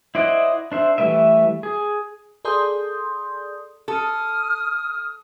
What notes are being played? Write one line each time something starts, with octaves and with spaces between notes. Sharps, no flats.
E4 C5 D5 D#5 F#5
D4 C5 E5
E3 G3 A3 B4 E5
G#4
G#4 A4 D5 C6 D#6 G6
A4 D#6 F6